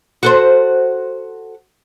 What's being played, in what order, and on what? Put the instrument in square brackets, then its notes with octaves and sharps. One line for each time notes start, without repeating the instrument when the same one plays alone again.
[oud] F#4 A4 C5